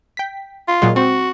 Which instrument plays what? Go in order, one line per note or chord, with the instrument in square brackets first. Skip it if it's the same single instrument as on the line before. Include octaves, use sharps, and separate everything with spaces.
[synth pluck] G5 B6
[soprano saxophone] F4
[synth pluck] A#2 F#3 G#3
[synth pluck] C4 [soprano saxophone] F#4